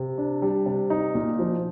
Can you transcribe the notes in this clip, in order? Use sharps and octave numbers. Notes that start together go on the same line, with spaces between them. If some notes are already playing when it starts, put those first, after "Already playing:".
Already playing: C3
D4
G3
C3
D#4
A#2
F3